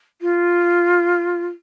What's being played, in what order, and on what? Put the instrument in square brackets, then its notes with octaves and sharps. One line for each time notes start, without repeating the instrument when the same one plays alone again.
[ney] F4